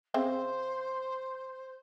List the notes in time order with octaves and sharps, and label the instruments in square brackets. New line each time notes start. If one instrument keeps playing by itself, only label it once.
[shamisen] C#3 C4 E5 [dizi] C5